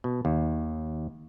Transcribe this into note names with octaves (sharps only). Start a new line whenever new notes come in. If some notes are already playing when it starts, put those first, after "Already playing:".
B2
D#2